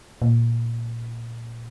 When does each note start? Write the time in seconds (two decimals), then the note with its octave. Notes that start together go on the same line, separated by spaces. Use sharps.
0.22 A#2